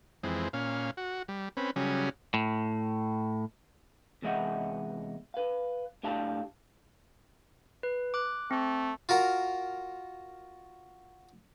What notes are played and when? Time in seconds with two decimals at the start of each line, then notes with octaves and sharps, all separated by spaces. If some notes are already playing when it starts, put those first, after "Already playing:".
0.23 F2 E3 G#3 C4
0.53 A#2 C#4 F5
0.97 F#4
1.28 G3
1.57 C4 C#4 B4
1.76 C#3 F#3 G3 C#4 G#4
2.34 A2
4.22 E2 C3 G#3 D#5 E5 F#5
5.34 B4 F5
6.03 A2 D4 G4 F5 A5
7.83 B4
8.14 D6 F#6
8.51 A3 C4
9.09 F4 F#4 A#4